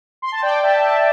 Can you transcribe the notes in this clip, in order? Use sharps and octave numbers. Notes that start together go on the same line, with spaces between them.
C6
A5
D5 G5
E5 A5
E5 A5